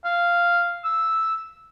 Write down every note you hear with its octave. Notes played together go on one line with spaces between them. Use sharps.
F5
E6